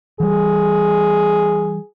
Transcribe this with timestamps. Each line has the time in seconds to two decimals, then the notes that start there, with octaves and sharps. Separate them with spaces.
0.20 E3 G3 G#4